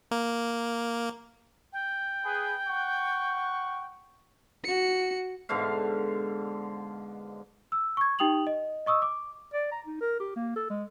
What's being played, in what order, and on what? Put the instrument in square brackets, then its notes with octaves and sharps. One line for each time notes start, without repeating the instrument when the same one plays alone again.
[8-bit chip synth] A#3
[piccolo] G5
[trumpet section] G#4 B4
F#5 C#6
[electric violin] F#4 C#7
[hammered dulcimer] G#2 B2 D3 F5
[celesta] E6
C#6 G#6
D#4 G4 G5 D#6 F7 F#7
D#5
D#5 C#6 D#6 E6
D6
[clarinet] D5
A#5
D#4
A#4
G4
A#3
A4
G#3